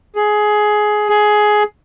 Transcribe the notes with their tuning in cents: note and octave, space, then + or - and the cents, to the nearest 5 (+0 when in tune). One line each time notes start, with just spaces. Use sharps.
G#4 +15
G#4 +15